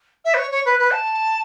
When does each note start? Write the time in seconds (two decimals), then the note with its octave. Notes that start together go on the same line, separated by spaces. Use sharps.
0.24 E5
0.34 B4
0.37 C#5
0.51 C#5
0.65 B4
0.79 B4
0.91 A5